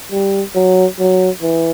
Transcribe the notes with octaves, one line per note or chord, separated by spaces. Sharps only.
G3
F#3
F#3
E3